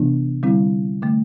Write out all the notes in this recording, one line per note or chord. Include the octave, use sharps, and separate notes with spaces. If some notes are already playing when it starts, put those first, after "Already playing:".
Already playing: C3 E3 B3 D4
D3 G3 C4 E4
D3 A3